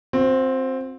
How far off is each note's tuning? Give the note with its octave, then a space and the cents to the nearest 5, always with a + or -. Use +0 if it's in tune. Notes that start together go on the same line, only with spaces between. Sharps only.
C4 +5 F#4 -45